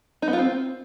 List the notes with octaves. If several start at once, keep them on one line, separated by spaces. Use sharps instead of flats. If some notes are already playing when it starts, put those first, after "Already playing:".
D#4
B3
F4
C4